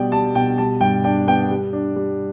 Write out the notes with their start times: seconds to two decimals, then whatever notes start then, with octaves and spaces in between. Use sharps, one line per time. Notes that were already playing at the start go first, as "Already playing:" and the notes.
Already playing: B2 G3 D5 G5
0.12 G3 A5
0.35 B2 G5
0.58 G3 A5
0.81 G2 G5
1.04 D4 G5
1.27 B3 G5
1.51 G3
1.73 D4
1.96 G3